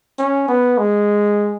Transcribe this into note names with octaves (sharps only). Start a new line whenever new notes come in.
C#4
B3
G#3